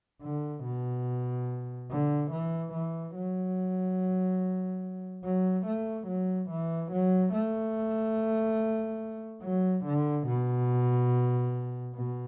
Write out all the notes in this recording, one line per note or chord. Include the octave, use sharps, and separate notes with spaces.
D3
B2
D3
E3
E3
F#3
F#3
A3
F#3
E3
F#3
A3
F#3
D3
B2
B2